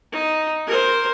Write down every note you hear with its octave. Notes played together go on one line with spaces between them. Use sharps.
D#4
A#4 C5